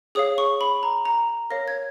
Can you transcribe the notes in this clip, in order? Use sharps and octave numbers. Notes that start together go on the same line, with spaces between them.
G#4 C#5 F5 D#6
C#6
B5
A#5
A#5
A#4 C#5 F5 A#6
G#6